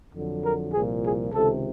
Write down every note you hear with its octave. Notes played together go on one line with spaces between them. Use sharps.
F2 D3 F#3
A#4
C2 A#2 F3 G#4
G#4
C#2 C3 D#3 A4